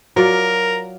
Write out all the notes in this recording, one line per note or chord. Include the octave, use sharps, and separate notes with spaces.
F#3 F4 A#4 D5